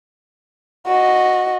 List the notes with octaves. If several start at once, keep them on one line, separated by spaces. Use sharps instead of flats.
F#4 D#5